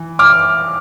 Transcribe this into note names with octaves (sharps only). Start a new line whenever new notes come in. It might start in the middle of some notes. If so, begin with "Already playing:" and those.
Already playing: E3
D6 F6